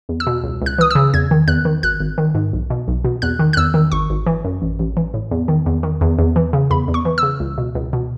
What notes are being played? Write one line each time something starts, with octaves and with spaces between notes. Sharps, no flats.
E2
E6
B2
C#2
C#2 F#6
E3 D#6
C#3 E6
E2 G#6
D#3
E2 F#6
D#3
G#1 F#6
G#1
D#3
G#2
B1
B2
B1
B2
E2 F#6
D#3
F#6
E2 E6
D#3
G#1 C#6
G#1
E3
F#2
A1
A1
E3
A2
E2
D#3
E2
D#3
E2
E2
E3
C#3
E2 B5
E2
C#6
E3
C#3 E6
C#2
B2
C#2
B2